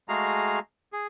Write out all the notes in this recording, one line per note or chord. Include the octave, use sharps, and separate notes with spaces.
G#3 A3 F#4 G#4 F5 A#5
G#4